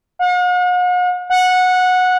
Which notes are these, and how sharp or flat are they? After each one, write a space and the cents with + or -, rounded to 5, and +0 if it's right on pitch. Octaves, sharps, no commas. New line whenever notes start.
F#5 -45
F#5 -15